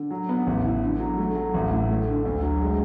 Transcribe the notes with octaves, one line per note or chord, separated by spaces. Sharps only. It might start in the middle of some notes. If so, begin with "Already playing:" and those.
Already playing: D3
F#3
B3
A1
E3
D3
F#3
A3
F#3
A1
A2
A3
D3
D2
F#3
G#3